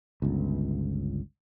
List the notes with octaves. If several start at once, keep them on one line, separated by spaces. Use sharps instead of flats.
G1 C#2